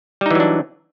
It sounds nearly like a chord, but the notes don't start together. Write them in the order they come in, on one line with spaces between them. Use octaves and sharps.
G3 D#4 E3 F#3 D4